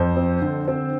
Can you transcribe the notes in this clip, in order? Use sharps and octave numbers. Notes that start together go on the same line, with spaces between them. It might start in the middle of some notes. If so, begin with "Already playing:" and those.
Already playing: F2 C5
C4
D3
C4